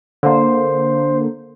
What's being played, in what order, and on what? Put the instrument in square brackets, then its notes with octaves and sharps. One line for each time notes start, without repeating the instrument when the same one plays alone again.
[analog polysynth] D3 A#3 [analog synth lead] C5